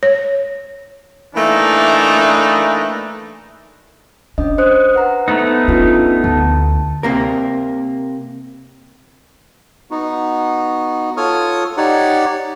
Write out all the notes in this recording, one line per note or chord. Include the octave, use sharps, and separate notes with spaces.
C#5
E3 A3 A#3 D4 D#4
C#4 D4 D#5
C5 D#6 F#6
B4 F#5 A#5
A3 B3 D#4
C#4 D4 F4 B4
D2 A5
C3 A#3 A#4
B3 D#4 F#4
F4 A4 C#5 C#6 D#6 F6
D#4 G4 C#5 D5 F#5